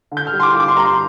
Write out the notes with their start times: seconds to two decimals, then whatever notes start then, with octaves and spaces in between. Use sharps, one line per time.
0.11 D3
0.17 G6
0.27 F6
0.33 G3
0.40 C6
0.43 D6
0.54 F4
0.60 D6
0.68 C6
0.76 G2 A#5
0.85 C6